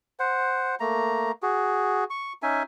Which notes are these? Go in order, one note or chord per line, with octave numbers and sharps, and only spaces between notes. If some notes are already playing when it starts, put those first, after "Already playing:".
C5 F#5
A3 A#3 A#5
F#4 G#4
C#6
C#4 D#4 E5 G#5